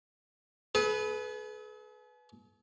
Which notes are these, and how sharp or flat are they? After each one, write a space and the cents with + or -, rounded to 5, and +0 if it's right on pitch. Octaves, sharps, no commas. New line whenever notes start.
G#4 +45 B4 +0